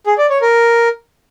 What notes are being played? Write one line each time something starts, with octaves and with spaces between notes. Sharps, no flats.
G#4
D5
C#5
A#4